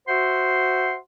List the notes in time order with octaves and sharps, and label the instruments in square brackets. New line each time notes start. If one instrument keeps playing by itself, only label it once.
[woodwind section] F#4 C5 E5 F#5 C6